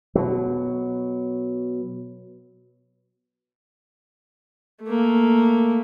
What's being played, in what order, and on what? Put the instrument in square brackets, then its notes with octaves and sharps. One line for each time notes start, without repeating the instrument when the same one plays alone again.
[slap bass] B2 F#3
[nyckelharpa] A3 A#3